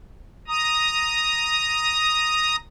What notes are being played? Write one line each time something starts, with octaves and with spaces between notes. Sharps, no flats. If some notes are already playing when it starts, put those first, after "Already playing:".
A#5 D#6